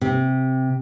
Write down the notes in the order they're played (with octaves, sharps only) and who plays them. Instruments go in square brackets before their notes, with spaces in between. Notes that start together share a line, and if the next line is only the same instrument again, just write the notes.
[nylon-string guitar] C3